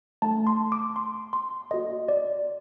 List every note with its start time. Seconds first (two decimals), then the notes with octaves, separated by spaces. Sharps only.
0.22 A3 D#4 A4 A5
0.47 C6
0.72 D6
0.96 C6
1.33 C6
1.71 A#3 F#4 A4 D#5
2.09 D5